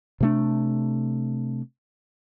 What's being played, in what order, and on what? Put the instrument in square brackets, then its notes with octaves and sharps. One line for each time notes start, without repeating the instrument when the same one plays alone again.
[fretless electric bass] C3 A3 D4